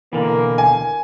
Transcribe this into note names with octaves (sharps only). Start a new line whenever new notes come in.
B2 D3 E3 A#3
G#5